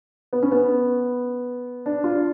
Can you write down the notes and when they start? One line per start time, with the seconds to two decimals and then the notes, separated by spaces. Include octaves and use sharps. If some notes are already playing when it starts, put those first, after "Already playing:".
0.33 B3
0.43 C#4
0.52 B3
1.86 D4
2.04 F4